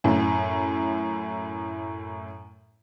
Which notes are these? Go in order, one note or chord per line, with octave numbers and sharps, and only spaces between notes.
F#2 A2